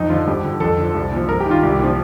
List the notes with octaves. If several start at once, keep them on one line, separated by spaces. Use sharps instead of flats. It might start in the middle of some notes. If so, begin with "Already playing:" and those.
Already playing: F2 D#4
D3 F3 F4
G2 G4
D3 F3
F2 A4
D3 F3
C2
A#2 F3
G2 A#4
G4
D#3 F4
C2 G4
A#2 F3